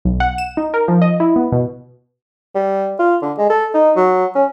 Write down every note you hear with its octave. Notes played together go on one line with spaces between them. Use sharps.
B1
F#5
E7
D#4
A#4
F3
D#5
E4
B3
B2
G3
F4
D3
G#3
A4
D#4
F#3
C#4